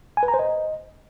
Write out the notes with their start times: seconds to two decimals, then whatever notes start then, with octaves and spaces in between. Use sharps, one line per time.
0.17 G#5
0.23 B4
0.28 A#5
0.34 C5
0.39 D#5